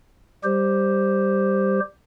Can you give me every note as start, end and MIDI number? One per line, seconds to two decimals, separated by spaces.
0.44 1.80 55
0.44 1.80 67
0.44 1.80 72